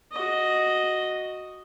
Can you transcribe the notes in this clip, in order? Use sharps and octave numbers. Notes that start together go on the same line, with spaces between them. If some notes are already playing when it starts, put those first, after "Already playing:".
F#4 D#5